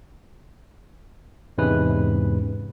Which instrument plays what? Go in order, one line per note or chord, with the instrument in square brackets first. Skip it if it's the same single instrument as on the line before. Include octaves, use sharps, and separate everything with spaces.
[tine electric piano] E2 G#2 C3 G#3 C#4 B4